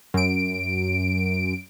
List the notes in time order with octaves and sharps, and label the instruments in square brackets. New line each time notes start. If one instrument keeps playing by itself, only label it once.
[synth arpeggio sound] F#2 D7